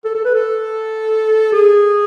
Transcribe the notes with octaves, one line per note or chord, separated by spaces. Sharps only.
A4
A4
B4
A4
G#4